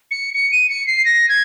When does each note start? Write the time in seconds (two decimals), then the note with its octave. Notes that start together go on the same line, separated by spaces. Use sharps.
0.11 C#7
0.35 C#7
0.52 D#7
0.70 C#7
0.87 C7
1.05 A#6
1.29 G#6